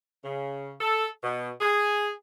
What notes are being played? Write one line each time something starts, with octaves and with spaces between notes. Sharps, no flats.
C#3
A4
B2
G#4